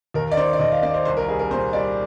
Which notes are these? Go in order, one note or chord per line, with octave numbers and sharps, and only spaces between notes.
D#2 A#4
D5
D#3 C5
D5
D#2 D#5
F5
A#3 D5
C5
C2 C5
A#4
G3 G#4
A#4
A#2 C5
G3 D5